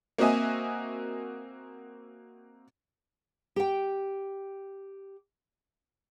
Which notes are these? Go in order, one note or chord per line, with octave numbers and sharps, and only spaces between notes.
A#3 C4 F#4 D#5 E5 G#5
G4 G5